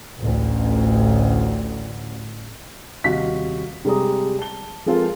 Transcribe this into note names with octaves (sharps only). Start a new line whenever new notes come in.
A1 D2
D#1 C3 F#4 D#5 F5 B6
C3 G3 G#3 A#5 D#6
A5 G7
F3 G#3 C4 F4 A4 A#4